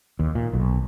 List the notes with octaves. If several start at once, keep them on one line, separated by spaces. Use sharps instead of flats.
D#2
A#2
B1